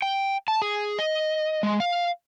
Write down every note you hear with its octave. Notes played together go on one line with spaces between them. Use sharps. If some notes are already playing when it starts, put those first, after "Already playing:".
G5
A5
G#4
D#5
G#3
F5